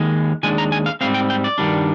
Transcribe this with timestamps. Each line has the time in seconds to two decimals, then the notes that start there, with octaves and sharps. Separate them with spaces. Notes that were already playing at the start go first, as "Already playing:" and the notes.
Already playing: D#2 D#3 G#3
0.43 D#2 D#3 G#3 D4 G#5
0.58 A#5
0.72 G#5
0.86 F5
1.01 G#2 G3 C4 F5
1.14 G5
1.30 G5
1.44 D5
1.58 G2 D#3 G3 D4